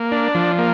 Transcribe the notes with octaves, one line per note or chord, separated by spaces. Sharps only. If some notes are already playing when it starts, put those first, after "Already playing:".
Already playing: A#3
D4
F3
A#3